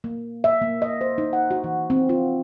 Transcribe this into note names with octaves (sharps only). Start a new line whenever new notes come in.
A#3
E5
A#3
D#5
C5
D#4
F#5
F#4
E3
C4
F4